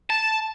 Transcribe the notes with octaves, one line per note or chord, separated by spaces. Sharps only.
A5